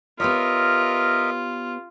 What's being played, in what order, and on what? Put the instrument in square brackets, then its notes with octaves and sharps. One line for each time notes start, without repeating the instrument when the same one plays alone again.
[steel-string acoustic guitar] B3 G4 C#5 [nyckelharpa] F4 [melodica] A#4 D#5 E5